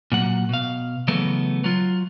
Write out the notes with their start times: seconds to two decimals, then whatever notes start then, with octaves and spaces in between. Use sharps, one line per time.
0.12 A#2 F#3 F#5
0.49 B2 F5
1.08 C#3 E3 F#3 A3 B3
1.64 F#3 F4